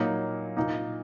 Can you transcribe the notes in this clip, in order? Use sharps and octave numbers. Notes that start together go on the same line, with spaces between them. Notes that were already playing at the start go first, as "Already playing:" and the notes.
Already playing: A#2 F#3 A#3 D#4
A#2 A#3 D#4